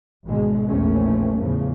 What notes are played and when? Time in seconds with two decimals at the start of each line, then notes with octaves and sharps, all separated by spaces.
0.25 G#1 B2 D3 G#3
0.67 A#1 E2 A3 C4 C#4
1.38 E2 A2 C#3 F3